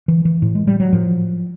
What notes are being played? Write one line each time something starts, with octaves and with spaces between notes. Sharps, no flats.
E3
E3
A2
G#3
G3
F#3
A2 F3